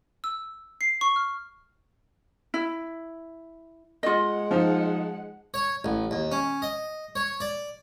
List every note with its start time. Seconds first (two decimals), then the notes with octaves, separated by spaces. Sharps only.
0.24 E6
0.81 C7
1.01 C#6
1.16 F6
2.54 E4
4.03 G#3 F4 D#5 F#5
4.51 F3 D#4
5.54 C#5
5.84 A1
6.11 D#2
6.32 C#4
6.62 D#5
7.16 C#5
7.40 D5